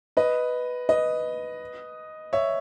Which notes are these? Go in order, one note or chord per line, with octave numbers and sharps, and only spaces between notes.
B4 D#5
B4 D#5
C#5 E5